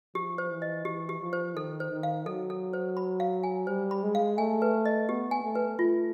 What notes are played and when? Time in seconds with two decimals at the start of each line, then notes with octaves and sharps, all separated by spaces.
0.15 F3 G4
0.38 C5
0.50 E3
0.62 D#5
0.85 E3 G4
1.09 G4
1.21 F3
1.33 C5
1.56 D#3 A4
1.80 C5
1.92 D#3
2.03 F5
2.26 F#3 A4
2.50 A4
2.73 C5
2.97 B5
3.20 F5
3.43 G#5
3.67 G3 C5
3.91 B5
4.03 G#3
4.15 F5
4.38 A3 G#5
4.62 B4
4.86 D#5
5.09 B3 G4
5.31 G#5
5.44 A3
5.55 B4
5.79 A3 F4